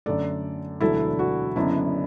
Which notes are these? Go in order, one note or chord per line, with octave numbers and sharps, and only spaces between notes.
F#2 D3 A3 A4 D5
E1 D2 D3 F#3 D4 E4 A4
F#4
F#1 F#2 D3 B3 D4 E4